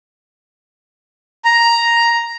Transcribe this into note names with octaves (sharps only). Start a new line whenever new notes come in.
A#5